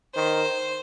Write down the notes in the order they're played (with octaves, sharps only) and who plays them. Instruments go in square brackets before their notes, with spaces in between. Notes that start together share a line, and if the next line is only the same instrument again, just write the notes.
[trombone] D#3 [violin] C5